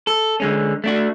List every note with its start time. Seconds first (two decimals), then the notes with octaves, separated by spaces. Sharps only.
0.07 A4
0.40 D3 G#3 C#4
0.84 A3 D4 F#4